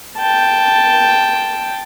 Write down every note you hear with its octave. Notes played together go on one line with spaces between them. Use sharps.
G5 A5